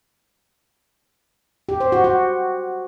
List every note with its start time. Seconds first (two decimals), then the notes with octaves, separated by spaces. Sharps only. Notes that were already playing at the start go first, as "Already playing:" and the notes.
1.69 G4
1.80 C5
1.92 F#4
2.04 F#4